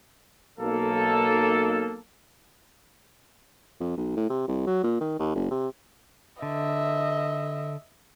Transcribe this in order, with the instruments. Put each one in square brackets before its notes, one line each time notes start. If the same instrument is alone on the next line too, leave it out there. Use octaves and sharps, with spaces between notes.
[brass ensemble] B1 A#3 A4
[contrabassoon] F2
B1
A2
C3
C2
F#3
A#2
D#3
D#2
F#1
C3
[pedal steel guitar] D3 [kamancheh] D#5 E5